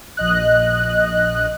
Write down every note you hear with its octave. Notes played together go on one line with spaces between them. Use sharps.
A#1 D#5 F#6